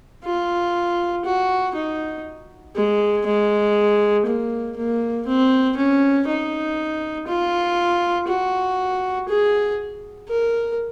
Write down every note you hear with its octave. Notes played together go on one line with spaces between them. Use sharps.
F4
F#4
D#4
G#3
G#3
A#3
A#3
C4
C#4
D#4
F4
F#4
G#4
A#4